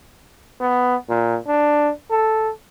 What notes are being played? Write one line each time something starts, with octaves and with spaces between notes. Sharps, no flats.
B3
A#2
D4
A4